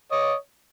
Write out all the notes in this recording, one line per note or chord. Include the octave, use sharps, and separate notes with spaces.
C#5 D#5